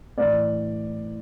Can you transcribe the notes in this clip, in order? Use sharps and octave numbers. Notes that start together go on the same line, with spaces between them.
A2 E3 D5